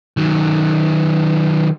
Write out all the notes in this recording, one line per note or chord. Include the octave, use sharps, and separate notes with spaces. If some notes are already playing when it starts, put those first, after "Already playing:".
D#3 F#3